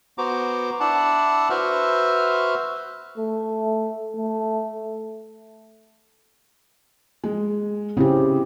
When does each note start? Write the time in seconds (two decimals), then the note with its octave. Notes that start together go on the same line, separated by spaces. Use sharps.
0.18 B3 F#4 C5 A#5 D6
0.80 D4 E4 F#5 A5
1.50 F#4 B4 C5 E5 F6
3.18 A3
4.17 A3
7.24 G#3
7.97 C#3 C4 E4 G4